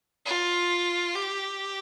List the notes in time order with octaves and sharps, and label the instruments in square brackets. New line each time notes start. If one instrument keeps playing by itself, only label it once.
[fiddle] F4
G4